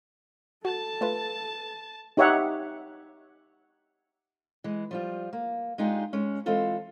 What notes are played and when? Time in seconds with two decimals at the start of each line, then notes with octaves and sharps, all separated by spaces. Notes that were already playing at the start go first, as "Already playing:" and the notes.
0.65 F#4 A4 A5 A6
1.01 A3 F4 B4
2.17 D#4 G4 C#5 E5 F#5
4.64 E3 G#3
4.91 F3 G3 F4
5.33 A#3
5.78 G#3 D4 D#4 F4 G4 G#4
6.13 G#3 C#4
6.46 E3 G#3 C4 F4 A4 C5